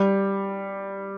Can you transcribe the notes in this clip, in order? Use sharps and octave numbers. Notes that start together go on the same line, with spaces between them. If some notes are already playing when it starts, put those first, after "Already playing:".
Already playing: G3